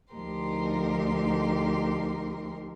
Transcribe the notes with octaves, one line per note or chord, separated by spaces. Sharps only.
D2 F3 D#4 G4 A#4 C6